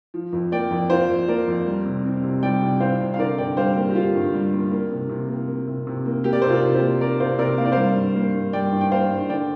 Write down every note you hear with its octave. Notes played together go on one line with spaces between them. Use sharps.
F3
F2
A#3 D5 G5
F2
F3 C5 F5
F2
A#3 A#4 D5
F2
G3
C3
C4
C3
G3 D5 G5
C3
C4 C5 F5
C3
F5
D3 A#4 D5
G2 D5 G5
G3 C5 F5
A#3 G4
G4
D3 F4
G2
G3
A#3
A#3
C3
C3
A#3
A#3
C3
C3
A#3
A#3 G4
D5
C3 C5
F4 A#4
C3
G4 C5
A#3
A#3 A#4 D5
C3 C5 F5
C3 A#4 D5
A#3 F5
D5
G3 C5 F5
G2
A#3
G2
G3 D5 G5
G2
G5
A#3 C5 F5
G2
D3 D5 G5